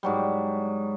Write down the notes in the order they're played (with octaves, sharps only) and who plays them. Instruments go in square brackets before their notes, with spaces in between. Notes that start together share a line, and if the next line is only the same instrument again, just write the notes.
[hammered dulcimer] G#2 F#3 G3